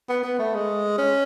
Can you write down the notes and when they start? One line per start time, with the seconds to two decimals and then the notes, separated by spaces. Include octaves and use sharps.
0.09 B3
0.23 B3
0.39 A3
0.54 G#3
0.98 C#4